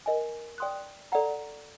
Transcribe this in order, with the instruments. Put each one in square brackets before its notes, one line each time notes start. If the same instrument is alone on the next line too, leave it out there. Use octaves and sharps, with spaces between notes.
[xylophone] A#4 D#5 G#5
D5 G5 C6 D#6 F#6
A4 D5 F#5 A#5